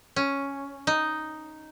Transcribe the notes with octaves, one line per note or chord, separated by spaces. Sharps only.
C#4
D#4